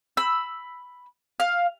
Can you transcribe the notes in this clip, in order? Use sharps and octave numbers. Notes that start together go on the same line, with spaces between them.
B5 E6
F5